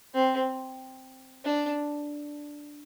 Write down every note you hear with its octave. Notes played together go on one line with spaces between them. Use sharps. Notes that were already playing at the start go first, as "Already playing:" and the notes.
C4
D4